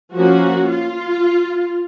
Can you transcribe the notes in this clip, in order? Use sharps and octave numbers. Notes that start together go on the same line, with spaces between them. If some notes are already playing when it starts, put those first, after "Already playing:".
F3 A#3 C#4 F#4
F4